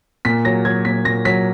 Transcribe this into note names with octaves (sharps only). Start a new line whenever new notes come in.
A#2 B6
F#3 A#6
F#3 G#6
A#2 B6
A#2 A#6
F#3 B6